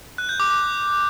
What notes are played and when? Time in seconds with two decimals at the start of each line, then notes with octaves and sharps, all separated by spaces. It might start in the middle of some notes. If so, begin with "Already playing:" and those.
0.18 F#6
0.29 G6
0.40 D6
0.50 D6